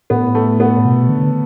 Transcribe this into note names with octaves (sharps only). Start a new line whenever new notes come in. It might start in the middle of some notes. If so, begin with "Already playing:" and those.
A2 B3
A3
B3
B2
D3